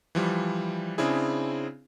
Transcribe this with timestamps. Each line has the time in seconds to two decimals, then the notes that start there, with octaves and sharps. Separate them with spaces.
0.15 E3 F3 G3
0.98 C#3 C4 D4 E4 G#4